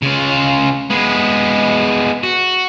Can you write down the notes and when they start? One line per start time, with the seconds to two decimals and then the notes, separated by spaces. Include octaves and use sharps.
0.02 C#3 F4
0.90 G#3 B3
2.23 F#4